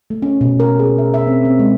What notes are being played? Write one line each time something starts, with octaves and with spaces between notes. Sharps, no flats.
A3
C#4
B2
A#4
G#4
E5
E5
C4
C4
G#3